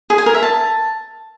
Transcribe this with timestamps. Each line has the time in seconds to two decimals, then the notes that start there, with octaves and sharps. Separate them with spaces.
0.10 G#4
0.18 G#5
0.26 A#4
0.34 E5
0.43 A5